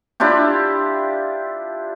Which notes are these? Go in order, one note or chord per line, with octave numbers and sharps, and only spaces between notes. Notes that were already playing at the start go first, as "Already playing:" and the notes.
D4 E4 F4 G4